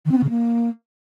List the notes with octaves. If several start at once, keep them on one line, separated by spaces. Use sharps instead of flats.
D#3
C4
B3
C#3
A#3